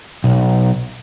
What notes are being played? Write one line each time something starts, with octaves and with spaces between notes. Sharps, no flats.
B1